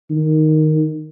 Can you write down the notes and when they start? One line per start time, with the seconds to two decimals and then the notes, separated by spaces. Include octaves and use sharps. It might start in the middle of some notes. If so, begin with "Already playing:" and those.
0.10 D#3